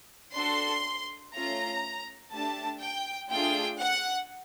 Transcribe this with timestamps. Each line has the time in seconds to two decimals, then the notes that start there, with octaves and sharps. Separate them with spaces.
0.35 D4 F#4 A4 C6
1.34 A3 C#4 F4 A#5
2.32 A3 D4 G4 A5
2.81 G5
3.30 A3 D4 F4 G#4 G5
3.80 F#5